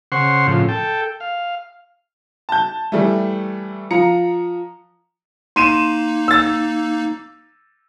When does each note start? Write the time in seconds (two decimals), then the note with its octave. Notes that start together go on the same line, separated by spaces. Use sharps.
0.12 C#3 C5 F#5 C6 C#6
0.47 A2 C#3 F3
0.69 A4 G5
1.20 F5
2.49 A5 G6
2.92 E3 G3 A3
3.91 F3 A#5 C#7
5.56 A#3 D#4 C6 D#7 E7
6.28 E6 A6